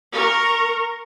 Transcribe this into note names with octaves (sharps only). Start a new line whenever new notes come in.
A#4 C#6